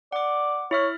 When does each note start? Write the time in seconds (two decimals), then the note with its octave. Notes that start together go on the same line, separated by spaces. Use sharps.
0.12 D5 F#5 D6
0.71 E4 C#5 E5 F6